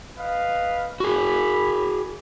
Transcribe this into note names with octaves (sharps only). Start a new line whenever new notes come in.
B4 D#5 F5
F#4 G#4 B5